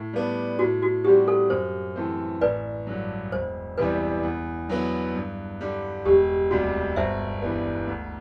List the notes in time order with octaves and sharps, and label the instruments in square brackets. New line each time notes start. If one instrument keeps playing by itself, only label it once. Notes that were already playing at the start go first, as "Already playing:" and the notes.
Already playing: [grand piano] A2
G3 B3 D4
[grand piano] A2 [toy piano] F#4
[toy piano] F#4
[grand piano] G3 C4 F#4 [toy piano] G4
[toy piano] A4
[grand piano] F#2 [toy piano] C5
[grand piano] E3 A3 C4
[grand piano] A1 [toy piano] B4 D5
[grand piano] G2 D3 F#3
[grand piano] E1 [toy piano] C5
[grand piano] E2 C3 E3 G3 [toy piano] B4
[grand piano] E2
D3 F#3 B3 E4
G2
D3 G3
[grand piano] E1 [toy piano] G4
[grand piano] D2 C3 G3 [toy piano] F#4
[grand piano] G1 [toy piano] C5 E5
[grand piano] G2 E3 G3 B3
D2